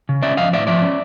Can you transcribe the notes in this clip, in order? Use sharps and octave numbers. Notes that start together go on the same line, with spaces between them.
C#3
C#4 D5 E5
F3 D#5 F5
A2 D5 E5
F3 D5 E5
C#4